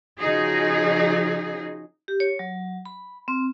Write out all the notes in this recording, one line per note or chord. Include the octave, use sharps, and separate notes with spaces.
C#3 F3 D#4 F#4 G#4
G4
C#5
F#3
B5
C4